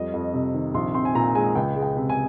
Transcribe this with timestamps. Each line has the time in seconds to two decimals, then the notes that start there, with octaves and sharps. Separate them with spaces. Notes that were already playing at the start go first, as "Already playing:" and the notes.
Already playing: F2 G3 D#5
0.13 F2
0.20 D#5
0.34 C3
0.54 D#3
0.74 A#1 C6
0.95 C4 C6
1.05 G#5
1.15 A#2 A#5
1.35 G#3 G#5
1.55 C#2 G5
1.76 G#3
1.82 G5
1.97 C3
2.10 G#5